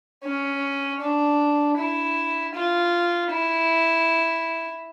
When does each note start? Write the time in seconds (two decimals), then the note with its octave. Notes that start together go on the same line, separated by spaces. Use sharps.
0.24 C#4
1.01 D4
1.78 E4
2.54 F4
3.31 E4